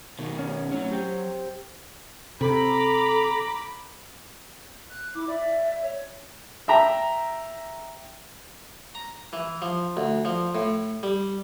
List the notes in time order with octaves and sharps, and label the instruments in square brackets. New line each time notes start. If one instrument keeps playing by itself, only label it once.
[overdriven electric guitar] B2 D#3
[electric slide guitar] C#4
[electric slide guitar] A2 C#4 [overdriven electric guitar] F#3
[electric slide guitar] G4 C5 G5
[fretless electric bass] C3 [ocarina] A4 [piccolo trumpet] A#5 [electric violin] B5 D6
[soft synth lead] F#6
[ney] E4 [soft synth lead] D6
[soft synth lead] D5 [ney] E5
[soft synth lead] C#5
[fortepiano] E5 G5 A#5
[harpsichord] A#5
E3
F3
D2
F3
A2
G3